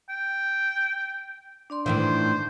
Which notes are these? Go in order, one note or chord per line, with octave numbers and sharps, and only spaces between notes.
G5
D4 D5 C6
A2 D#3 E3 C5